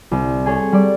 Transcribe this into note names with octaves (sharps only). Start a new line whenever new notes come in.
C2
G#4 A4 C#5
G3 D5